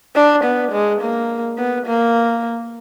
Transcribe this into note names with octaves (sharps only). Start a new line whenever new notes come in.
D4
B3
G#3
A#3
B3
A#3